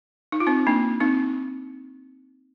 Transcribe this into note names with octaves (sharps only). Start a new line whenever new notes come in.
D#4
F4
C4 D#4
A#3 D4
C4 D#4